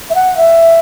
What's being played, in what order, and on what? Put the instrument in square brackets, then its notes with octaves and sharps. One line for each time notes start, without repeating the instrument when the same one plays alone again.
[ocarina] E5
F#5
E5